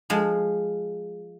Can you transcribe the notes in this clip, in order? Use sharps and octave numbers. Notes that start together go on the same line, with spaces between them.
F3 G#3